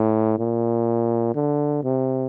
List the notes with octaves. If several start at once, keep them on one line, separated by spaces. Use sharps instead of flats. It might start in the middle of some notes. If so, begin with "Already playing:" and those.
Already playing: A2
A#2
D3
C3